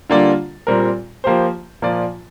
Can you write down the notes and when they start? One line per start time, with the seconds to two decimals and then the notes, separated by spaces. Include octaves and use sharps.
0.10 D3 G3 A#3 F4 D5
0.67 A#2 G3 C4 A#4
1.24 F3 A#3 G4 C5
1.82 A#2 F3 A#3 F4 D5